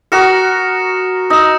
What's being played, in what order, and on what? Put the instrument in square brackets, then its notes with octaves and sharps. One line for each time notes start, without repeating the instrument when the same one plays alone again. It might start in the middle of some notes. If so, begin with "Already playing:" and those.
[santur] F#4 A#4 [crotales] D#6 A#6 C#7 E7
[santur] D#4 [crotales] E6 A#6 E7